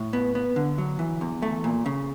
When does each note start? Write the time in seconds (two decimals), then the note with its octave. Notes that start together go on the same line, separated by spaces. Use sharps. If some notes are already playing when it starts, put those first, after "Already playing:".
Already playing: A2
0.13 B3
0.35 B3
0.56 D3
0.78 F#3
0.99 E3
1.21 E2
1.42 A3
1.64 A#2
1.86 C#3